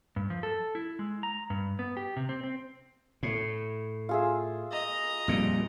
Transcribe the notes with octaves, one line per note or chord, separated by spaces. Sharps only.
G2
F3
A4
E4
G#3
A#5
G2
B3
G4
C3
C4
C4
A2
F4 G#4 E5
D#5 A#5
F2 A#2 G3